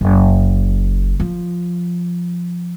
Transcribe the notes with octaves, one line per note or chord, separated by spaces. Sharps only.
F#1
F3